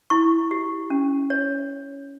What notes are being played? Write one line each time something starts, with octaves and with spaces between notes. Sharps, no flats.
E4 C#6
G4
C#4
C#5